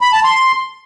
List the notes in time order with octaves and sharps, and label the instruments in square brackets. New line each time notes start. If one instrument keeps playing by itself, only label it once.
[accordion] B5
A5
C6